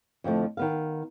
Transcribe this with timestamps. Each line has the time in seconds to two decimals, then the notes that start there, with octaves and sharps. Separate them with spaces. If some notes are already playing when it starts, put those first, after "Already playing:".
0.24 F2 D3 F3 A3 E4
0.57 D#3 B3 F5